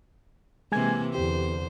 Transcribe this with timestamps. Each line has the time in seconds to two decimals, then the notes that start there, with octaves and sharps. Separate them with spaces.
0.72 C3 E3 G#3 A#3 G#5 G#6
1.15 E2 D3 G4 C5